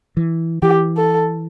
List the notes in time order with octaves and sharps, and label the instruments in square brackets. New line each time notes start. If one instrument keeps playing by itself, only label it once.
[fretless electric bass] E3
[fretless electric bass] E3 [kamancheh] G4
[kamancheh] A4